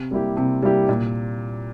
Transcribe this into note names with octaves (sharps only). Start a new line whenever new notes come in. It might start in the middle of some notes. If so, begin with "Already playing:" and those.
Already playing: C3
G3 A#3 E4 G4
C3
G3 A#3 E4 G4
A#2